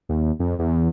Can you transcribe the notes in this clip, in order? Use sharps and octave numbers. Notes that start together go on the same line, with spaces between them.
D#2
F2
E2